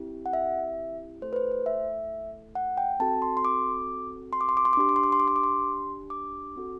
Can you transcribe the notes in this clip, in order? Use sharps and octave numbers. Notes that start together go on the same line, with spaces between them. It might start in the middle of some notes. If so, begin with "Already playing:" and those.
Already playing: C4 E4 G4
F#5
E5
A3 E4 A4 C5
B4
C5
C5
E5
F#5
G5
C4 F#4 A4 A5
C6
C6
D6
C6
D6
C6
D6
C6
D6
D4 G4 C6
D6
C6
D6
C6
D6
C6
D6
C6
D6
C4 F#4 A4